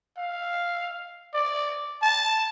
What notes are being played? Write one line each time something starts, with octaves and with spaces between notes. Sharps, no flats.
F5
D5
A5